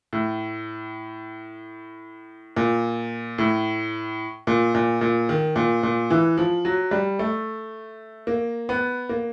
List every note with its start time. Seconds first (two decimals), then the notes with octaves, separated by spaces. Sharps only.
0.13 A2
2.56 A#2
3.38 A2
4.47 A#2
4.75 A#2
5.01 A#2
5.29 D#3
5.56 A#2
5.83 A#2
6.10 E3
6.38 F3
6.65 F#3
6.91 G3
7.19 A3
8.27 A#3
8.69 B3
9.09 A#3